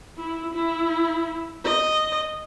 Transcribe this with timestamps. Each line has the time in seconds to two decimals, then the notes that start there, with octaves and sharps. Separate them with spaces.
0.18 E4
0.54 E4
1.64 D#5